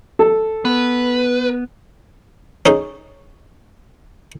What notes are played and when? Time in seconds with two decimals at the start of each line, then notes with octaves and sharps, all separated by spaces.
0.19 A4
0.65 B3 B4
2.66 C#4 D#4 G#4